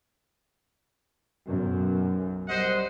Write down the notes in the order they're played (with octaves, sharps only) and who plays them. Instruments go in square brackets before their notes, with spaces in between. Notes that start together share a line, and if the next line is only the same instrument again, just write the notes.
[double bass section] B1 F#2
[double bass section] G3 [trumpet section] C5 D#5 F#5